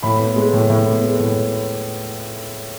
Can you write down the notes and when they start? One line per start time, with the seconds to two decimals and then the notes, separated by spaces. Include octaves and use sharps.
0.03 A2 B5
0.19 B3
0.36 G#3
0.53 A2
0.70 A2
0.86 B3
1.04 G#3
1.20 A2